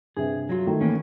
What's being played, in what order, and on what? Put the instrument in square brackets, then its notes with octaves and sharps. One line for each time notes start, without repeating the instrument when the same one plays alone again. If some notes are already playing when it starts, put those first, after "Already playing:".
[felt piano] G2 C3 [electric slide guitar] G#4
[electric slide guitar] F#3 F4
[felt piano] D#3 A3
[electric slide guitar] E3 A#3 C#4